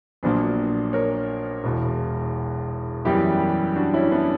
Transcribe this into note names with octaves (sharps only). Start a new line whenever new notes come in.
A#1 A#2 F#3 A#3 B3 D4
A#4 C#5
E1 E2 B2
F#2 E3 G3 B3 E4 G4
D4 F#4
C#4 E4
B3 D4